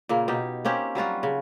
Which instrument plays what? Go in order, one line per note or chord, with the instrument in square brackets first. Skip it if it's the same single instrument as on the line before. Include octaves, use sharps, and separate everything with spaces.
[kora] A#2 C#3 A#3
B2 D#4 G4
A#3 C4 C#4 G4
F#3 G3 F4 F#4
C#3